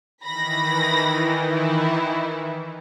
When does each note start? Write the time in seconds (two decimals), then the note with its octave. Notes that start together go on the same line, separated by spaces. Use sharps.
0.23 D#3 E3 B5 A#6
1.53 E4